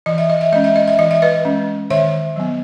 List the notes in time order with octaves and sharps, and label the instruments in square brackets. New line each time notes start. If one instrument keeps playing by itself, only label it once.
[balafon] E3 D#5
E5
D#5
E5
G#3 C#4 D#5
E5
D#5
E5
E3 D#5
E5
B4 D#5
G#3 C#4
D#3 C#5 E5
F#3 B3